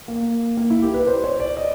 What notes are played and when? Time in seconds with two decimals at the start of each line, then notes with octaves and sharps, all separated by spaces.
0.08 A#3
0.57 A#3
0.70 E4
0.82 G4
0.94 B4
1.07 C5
1.24 C#5
1.40 D5
1.57 D#5